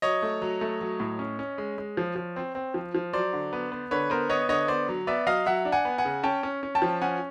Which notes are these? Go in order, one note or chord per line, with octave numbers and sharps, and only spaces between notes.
F#3 C#5 D#5
A3
F#3
A3
F#3
A2
C#4
C#4
G#3
G#3
F3
F3
C4
C4
F3
F3
F#3 C5 D5
D3
B3
B3
D3 B4 C#5
B3 A#4 C5
B3 C#5 D#5
D3 C#5 D#5
B3 C5 D5
F#3
B3 D5 E5
F#3 D#5 F5
F#3 E5 F#5
D4
F#5 G#5
B3
F#5 G#5
C#3
C#4 G5 A5
C#4
C#4
G5 A5
F3
C#4 F#5 G#5